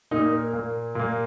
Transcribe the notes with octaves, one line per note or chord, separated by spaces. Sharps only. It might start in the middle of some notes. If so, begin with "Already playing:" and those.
A#2 A#3 D#4
A#4
A#2 A#3
A#2 A#3